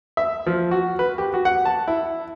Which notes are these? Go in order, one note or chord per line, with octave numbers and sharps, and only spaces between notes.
E5
F3
F#4
B4
G4
F#4
F#5
A5
E4